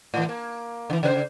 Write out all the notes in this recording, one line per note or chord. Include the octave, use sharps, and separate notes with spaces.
A2 E3
A#3
D3 E3
C#3 B4 C5